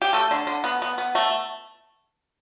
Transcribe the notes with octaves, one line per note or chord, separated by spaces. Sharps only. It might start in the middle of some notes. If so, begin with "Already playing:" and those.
G4
A3 A4
D3
D3
B3
B3
B3
A3